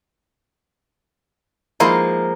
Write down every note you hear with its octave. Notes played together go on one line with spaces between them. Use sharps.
F3 G#3 A#3 D#4 E4 C6